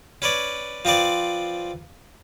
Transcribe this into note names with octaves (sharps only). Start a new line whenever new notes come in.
C#4 B4 C#5 D5
F3 C4 B4 D5